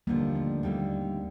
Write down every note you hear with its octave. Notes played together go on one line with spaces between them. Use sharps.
D#2 D3 F3 G3 A#3
A3
D#2 D3 G3 C4